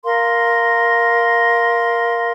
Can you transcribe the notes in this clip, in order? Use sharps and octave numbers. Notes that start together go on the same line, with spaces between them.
A#4 F5 C6